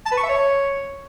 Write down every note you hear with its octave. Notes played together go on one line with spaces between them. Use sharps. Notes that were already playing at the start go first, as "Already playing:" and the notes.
A5
B4
C#6
E5
C#5